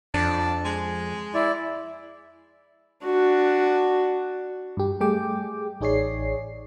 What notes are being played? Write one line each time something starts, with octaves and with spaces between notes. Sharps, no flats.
F2 D4
G#3
E4 D5
D4 F#4
G2 G4
G3 A3 G#4 G5 D6
A1 D#4 G#4 C#5 D5 C7